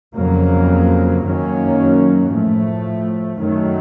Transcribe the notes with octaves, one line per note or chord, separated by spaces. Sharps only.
F2 C#3 F#3 A#3
F#2 D#3 F#3 A#3 C#4
A2 F3 A3
F#2 D#3 F#3 A3